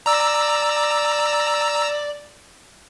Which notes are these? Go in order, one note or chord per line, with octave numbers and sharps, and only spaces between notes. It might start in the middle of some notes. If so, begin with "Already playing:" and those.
D5 A#5 E6